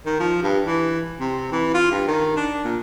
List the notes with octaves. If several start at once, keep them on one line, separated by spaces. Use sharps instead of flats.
D#3
F3
G2
E3
C3
E3
F4
G2
D#3
D4
A#2